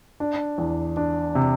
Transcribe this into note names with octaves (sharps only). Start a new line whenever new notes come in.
D4
E2
D4
C3